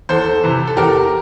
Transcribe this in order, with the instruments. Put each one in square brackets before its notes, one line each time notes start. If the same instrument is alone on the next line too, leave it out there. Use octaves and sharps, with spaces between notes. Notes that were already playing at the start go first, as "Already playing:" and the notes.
[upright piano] E2 A4 C5
C3 E3
A4
E2 G4 A#4